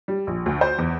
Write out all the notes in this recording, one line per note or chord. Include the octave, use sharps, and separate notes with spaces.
G3
A#1
D2
C5
E2